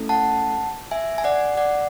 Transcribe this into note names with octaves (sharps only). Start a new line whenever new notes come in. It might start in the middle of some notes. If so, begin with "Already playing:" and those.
Already playing: A3 C#4 E4 A4
F#5 A5
E5 G#5
G#5
D5 F#5
D5 F#5